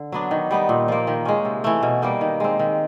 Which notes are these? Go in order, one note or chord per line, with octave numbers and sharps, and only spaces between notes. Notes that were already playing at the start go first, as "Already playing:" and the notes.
Already playing: D3
F#3 B3 D4
D#3
G3 B3 D#4
A#2
F3 A#3
D#3
G#3 C#4
C3
E3 A3
B2
G3 A#3 D#4
D#3
G#3 C4
D#3